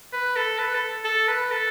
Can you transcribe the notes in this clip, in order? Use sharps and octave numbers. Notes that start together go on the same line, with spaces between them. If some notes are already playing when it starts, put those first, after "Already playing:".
B4
A4
B4
A4
A4
B4
A4